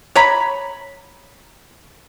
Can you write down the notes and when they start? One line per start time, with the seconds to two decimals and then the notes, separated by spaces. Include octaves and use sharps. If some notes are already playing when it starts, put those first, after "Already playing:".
0.16 C#5 A#5 B5